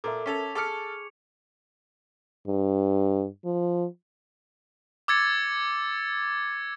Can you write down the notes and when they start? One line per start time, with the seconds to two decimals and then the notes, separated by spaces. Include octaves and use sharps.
0.04 A#2 A4 A#4 E5 D6
0.26 C#4 A4 C#6 G#6 B6 F7
0.55 G#4 A4 C#6 D6 F6 C#7
2.47 G2
3.45 F3
5.08 D6 E6 G#6 A6 C#7